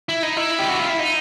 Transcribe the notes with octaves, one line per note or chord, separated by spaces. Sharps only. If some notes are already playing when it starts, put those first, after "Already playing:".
E4
D#4
E4
G4
F#4
F4
E4
D#4